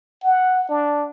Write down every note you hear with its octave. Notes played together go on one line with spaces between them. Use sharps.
F#5
D4